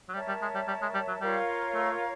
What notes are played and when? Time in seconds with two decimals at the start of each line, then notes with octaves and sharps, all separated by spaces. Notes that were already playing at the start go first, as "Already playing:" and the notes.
0.09 F#3
0.14 G3 A#4 C#5 E5 A5
0.28 G3
0.42 G#3
0.55 G3
0.68 G3
0.82 G#3
0.94 G3
1.08 F#3
1.21 G3 F4 A#4 C#5 F5
1.75 A3